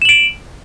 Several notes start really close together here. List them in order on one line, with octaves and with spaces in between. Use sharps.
E7 F#7 D7